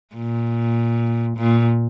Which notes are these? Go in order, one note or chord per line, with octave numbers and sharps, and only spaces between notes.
A#2
A#2